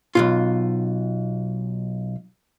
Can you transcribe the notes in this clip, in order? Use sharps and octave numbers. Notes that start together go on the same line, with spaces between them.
B1 G#2 F4